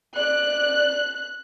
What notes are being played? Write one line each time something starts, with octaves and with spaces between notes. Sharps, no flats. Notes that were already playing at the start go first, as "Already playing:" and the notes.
D5 F#6